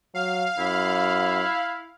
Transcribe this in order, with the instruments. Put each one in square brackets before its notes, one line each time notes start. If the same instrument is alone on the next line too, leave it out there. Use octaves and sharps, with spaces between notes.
[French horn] F#3 [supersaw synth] F5
[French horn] F#2 [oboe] E4